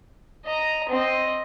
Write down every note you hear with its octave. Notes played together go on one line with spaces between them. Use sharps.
D#5 A#5
C4 D#5